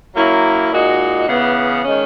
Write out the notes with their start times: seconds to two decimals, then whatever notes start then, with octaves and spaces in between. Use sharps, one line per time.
0.16 F#3 A#3 C#4 E4
0.72 A#2 G#3 D#4 F#4
1.29 C#3 E3 B3
1.85 D#3 G#3 C#4